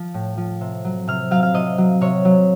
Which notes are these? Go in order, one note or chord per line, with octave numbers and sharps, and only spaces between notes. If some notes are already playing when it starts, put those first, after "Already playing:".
Already playing: F3
A2
F3
C3
F#3
C3 F6
F#3 F5
F5
C3 D#5
F#3
C3 C#5
F#3